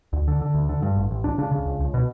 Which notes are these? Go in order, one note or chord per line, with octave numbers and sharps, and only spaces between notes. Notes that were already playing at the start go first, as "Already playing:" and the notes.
D2
D3
D3
D2
D3
G2
A1
A1
C#2 D4
C#3 D4
C#3
C#2
C#2
B2